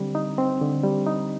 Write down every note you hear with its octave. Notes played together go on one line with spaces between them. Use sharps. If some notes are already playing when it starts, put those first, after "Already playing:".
Already playing: D3 G3 C4
D#4
C4
D3
G3
D#4